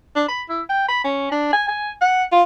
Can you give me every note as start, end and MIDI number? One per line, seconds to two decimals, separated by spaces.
0.15 0.23 62
0.28 0.42 83
0.49 0.62 64
0.69 0.88 79
0.88 1.03 83
1.04 1.28 61
1.31 1.49 62
1.53 1.64 80
1.68 1.91 80
2.01 2.23 78
2.32 2.43 65